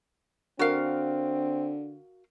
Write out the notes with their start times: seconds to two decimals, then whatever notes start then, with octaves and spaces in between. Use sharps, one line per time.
0.59 D3 C4 F#4 A#4 F5